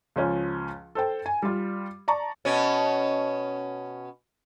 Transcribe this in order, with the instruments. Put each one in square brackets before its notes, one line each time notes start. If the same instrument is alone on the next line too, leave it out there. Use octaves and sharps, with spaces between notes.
[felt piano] C#2 F3 C#4
A4 C5 G5
G#5
G3 F4
D5 A5 A#5 C#6
[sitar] B2 C#4